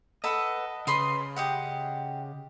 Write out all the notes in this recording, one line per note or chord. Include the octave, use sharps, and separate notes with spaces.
A4 B4 D#5 F#5
C#3 B4 C6 D#6
G4 D#5 F#5